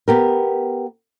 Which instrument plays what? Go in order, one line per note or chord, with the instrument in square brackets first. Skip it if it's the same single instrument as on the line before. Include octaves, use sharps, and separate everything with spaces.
[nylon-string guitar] B3 G4 A#4